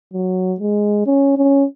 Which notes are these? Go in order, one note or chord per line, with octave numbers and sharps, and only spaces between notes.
F#3
G#3
C#4
C#4